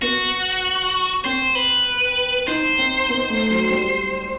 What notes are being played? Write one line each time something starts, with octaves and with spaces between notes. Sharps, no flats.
B3 F#4
C4 C5
B4
D#4 C5
C4
B3
A3
F#3
G3